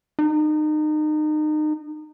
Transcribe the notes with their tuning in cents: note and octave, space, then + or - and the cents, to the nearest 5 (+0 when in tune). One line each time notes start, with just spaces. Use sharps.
D#4 -30